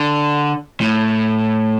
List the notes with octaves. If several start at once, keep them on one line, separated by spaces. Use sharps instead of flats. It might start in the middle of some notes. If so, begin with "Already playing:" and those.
Already playing: D3
A2